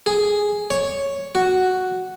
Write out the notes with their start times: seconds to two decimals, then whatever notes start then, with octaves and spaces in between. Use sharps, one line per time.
0.06 G#4
0.70 C#5
1.35 F#4